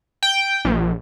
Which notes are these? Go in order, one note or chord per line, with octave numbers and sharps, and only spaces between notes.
G5
A#1